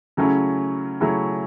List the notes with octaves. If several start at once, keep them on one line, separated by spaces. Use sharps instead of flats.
C#3 F#3 A3 C#4 E4
C#3 F#3 A3 C#4 E4